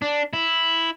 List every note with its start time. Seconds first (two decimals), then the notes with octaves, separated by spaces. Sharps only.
0.02 D4
0.33 E4